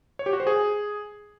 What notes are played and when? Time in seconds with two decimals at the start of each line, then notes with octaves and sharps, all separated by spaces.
0.19 C#5
0.26 G4
0.33 F#4
0.40 C5
0.47 G#4